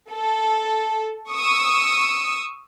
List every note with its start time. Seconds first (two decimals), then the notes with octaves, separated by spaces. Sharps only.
0.11 A4
1.32 C#6 D#6 E6